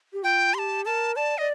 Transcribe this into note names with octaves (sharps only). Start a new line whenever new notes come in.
G4
F4 G5
G4 A5 C6
A#4 A5
D5 A5
D5 D#5